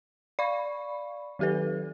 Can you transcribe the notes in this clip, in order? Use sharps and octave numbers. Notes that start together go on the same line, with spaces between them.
D5 F5 B5 C#6
D#3 F#3 G4 A4 B4